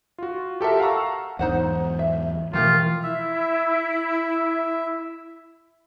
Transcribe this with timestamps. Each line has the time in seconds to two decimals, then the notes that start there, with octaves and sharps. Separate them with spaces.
0.18 F4 F#4
0.61 G4 A4 A#4 E5
0.80 F5 F#5 A5 A#5 C#6 E6
1.39 E2 G#2 D#4 C5 F#5
1.99 E5
2.53 B2 E3 F3 A3 F4 G4 A#4
3.03 E4 E5